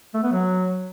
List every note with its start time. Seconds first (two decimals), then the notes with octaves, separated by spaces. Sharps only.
0.14 A3
0.23 B3
0.32 F#3